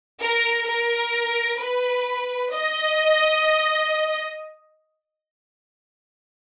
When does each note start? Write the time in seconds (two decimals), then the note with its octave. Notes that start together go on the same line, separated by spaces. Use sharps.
0.22 A#4
0.68 A#4
1.60 B4
2.53 D#5